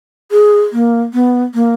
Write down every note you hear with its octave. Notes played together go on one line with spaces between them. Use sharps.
G#4
A#3
B3
A#3